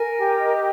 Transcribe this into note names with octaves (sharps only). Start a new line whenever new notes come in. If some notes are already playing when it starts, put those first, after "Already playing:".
Already playing: A#4 G#5
G4
D#5